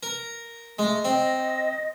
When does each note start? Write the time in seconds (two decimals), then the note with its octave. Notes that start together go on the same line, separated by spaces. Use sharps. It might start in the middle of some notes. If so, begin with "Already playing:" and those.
0.03 A#4
0.79 G#3 A3
1.05 C4 D#5